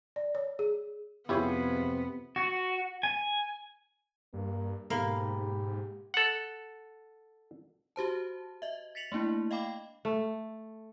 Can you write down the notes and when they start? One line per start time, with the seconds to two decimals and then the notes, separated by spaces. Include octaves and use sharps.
0.16 D5
0.35 C#5
0.59 G#4
1.29 F2 C3 B3 E4 F4 G4 G#4 C#5
2.36 F#4
3.03 G#5
4.34 G2 A#3
4.90 G#2 B2 A#3 G4 B5
6.14 A4 F#5
7.96 F#4 G4 C5 A5
8.62 D#5 E5
8.95 A6 B6 C#7 F7 F#7
9.12 A3 A#3 D4 E4
9.51 D#5 F5 G5 B5 D6
10.05 A3